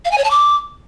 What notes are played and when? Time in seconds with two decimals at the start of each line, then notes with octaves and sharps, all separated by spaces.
0.05 F5
0.11 G#5
0.18 C#5
0.24 A5
0.31 D6